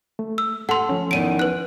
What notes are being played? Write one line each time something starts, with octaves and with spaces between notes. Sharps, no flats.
A3
E6
A4 F#5 C6
F3 C#4
E2 D#3 D7 D#7
B4 F#6